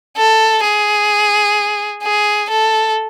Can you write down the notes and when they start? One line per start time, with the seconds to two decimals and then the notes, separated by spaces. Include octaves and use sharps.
0.17 A4
0.64 G#4
2.03 G#4
2.50 A4